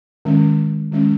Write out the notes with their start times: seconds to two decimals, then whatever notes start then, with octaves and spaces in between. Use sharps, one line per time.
0.25 D#3 G#3 C#4
0.92 D#3 G#3 C#4